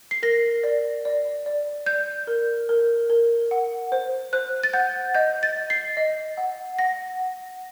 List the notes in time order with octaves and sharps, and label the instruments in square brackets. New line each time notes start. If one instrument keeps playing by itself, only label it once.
[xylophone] C7
A#4 A#6
D5
D5
D5
D5 G6
A#4
A#4
A#4
F#5
C5
C5 F#6
A6
F#5 G6
D#5 G6
A6
D#5
C7
D#5
F#5
F#5 A#6
F#5